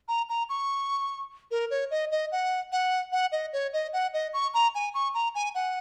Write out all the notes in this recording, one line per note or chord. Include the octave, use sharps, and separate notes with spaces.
A#5
A#5
C#6
A#4
C#5
D#5
D#5
F#5
F#5
F#5
D#5
C#5
D#5
F#5
D#5
C#6
A#5
G#5
C#6
A#5
G#5
F#5